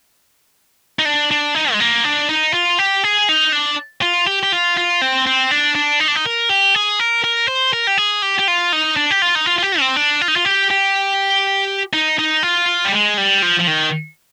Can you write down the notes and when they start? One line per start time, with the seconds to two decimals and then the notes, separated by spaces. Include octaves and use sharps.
0.99 D#4
1.05 D4
1.31 D4
1.55 D#4
1.72 G#3
1.80 A#3
2.04 D4
2.29 D#4
2.53 F4
2.79 G4
3.04 G#4
3.29 D#4
3.52 D4
4.02 F4
4.27 G4
4.43 G4
4.52 F4
4.77 F4
5.02 C4
5.27 C4
5.51 D4
5.75 D4
6.00 D#4
6.08 D4
6.15 D#4
6.26 A#4
6.49 G4
6.75 G#4
7.00 A#4
7.24 A#4
7.48 C5
7.73 A#4
7.87 G4
7.98 G#4
8.22 G4
8.39 G4
8.48 F4
8.73 D#4
8.97 D4
9.11 G4
9.22 F4
9.35 D#4
9.46 F4
9.58 F4
9.62 G4
9.80 C4
9.96 D4
10.21 F4
10.28 D#4
10.36 F4
10.45 G4
10.71 G4
11.93 D#4
12.19 D#4
12.43 F4
12.85 G3
12.92 G#3
13.17 G3
13.42 F3
13.59 F3
13.67 D#3